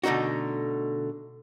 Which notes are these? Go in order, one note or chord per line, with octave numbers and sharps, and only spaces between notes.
B2 D3 A3 D#4 F#4